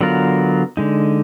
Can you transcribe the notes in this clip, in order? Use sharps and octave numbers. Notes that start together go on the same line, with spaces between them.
D3 F#3 B3 F4 A#4
D3 G#3 D#4